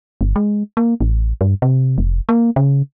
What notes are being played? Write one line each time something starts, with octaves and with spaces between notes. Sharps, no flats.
G1
G#3
A#3
A1
G2
C3
F1
A#3
C#3